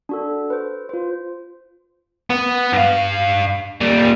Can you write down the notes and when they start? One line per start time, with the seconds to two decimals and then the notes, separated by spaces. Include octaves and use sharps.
0.09 D4 F#4 A4
0.50 B4 C5
0.89 F4 C5
2.30 B3
2.73 G2 F5
3.81 A#2 G3